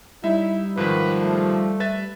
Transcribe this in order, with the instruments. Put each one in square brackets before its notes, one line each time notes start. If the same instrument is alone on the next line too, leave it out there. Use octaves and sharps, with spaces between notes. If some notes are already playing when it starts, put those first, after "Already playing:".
[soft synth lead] G3 [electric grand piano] D#4 E5 [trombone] E4
[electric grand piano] G#2 D#3 [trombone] F3 [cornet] B4
[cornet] A3
[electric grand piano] B4 E5 A6